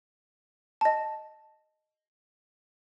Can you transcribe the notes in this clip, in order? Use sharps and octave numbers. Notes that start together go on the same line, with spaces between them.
D#5 A5